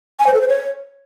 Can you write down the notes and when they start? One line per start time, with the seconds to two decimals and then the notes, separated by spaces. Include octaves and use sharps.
0.19 G#5
0.27 C5
0.34 A4
0.41 C5
0.48 C#5